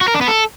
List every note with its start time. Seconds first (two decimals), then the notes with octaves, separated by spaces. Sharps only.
0.01 F#4
0.08 A#4
0.14 D4
0.21 B3
0.28 A4